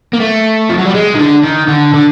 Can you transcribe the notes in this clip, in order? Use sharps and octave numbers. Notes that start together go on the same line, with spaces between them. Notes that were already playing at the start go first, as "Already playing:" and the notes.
A#3
A3
F3
F#3
G3
G#3
D#3
D3
D#3
D3
D3